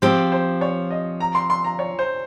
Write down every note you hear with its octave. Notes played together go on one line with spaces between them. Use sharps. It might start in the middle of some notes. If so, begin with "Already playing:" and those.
F3 C4 G4 C5
C5
C#5
D#5
A#5
C6
C6
A#5
C#5
C5